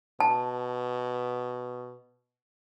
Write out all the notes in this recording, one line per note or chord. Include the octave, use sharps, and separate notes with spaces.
B2 A5